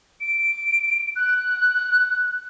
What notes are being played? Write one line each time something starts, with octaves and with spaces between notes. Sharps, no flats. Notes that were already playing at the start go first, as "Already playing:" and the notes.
D7
F#6